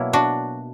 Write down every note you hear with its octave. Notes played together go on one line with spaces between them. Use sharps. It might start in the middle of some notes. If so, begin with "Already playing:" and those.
Already playing: B2 F#3 A#3 E4
D4 F#4